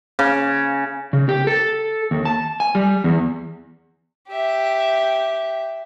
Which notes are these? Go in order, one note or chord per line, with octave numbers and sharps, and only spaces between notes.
C#3
C#3
G4
A4
D#2
A5
G#5
G3
E2
G4 E5